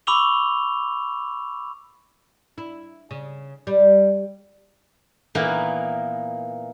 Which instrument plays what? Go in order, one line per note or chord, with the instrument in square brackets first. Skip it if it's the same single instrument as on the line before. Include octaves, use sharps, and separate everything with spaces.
[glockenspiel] B5 C#6 D6 E6 F7 G7
[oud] E4
C#3
G3
[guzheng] A#2 E3 A#3 B3 D#4